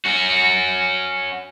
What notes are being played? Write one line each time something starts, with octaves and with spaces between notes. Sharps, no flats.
C#4 F#4